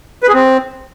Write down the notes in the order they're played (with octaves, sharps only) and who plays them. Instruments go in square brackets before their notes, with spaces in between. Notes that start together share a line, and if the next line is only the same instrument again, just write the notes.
[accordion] B4
G#4
C4